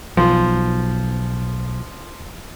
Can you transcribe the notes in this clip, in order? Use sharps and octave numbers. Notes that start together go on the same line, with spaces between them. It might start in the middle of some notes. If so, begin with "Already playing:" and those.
B1 F3